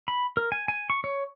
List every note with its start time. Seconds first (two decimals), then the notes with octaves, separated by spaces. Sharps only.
0.08 B5
0.37 A#4
0.52 G#5
0.68 G#5
0.90 C#6
1.04 C#5